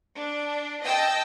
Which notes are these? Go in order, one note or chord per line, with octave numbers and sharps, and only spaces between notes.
D4
D#5 G5 A5 E6